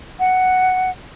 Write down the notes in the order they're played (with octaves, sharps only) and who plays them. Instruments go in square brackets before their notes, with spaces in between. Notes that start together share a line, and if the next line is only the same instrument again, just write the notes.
[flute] F#5